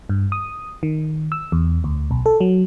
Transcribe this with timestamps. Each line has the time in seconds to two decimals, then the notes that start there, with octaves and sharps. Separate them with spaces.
0.09 G2
0.32 D#6
0.83 D#3
1.32 E6
1.52 E2
1.84 D2
2.11 B1
2.26 A4
2.41 F#3